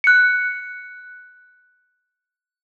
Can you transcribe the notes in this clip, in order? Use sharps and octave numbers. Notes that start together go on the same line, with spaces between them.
F#6 C#7